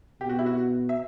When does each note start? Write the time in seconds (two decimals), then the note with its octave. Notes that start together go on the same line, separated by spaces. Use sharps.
0.21 B2 G4
0.29 F#4
0.39 E4
0.46 F#4
0.89 E5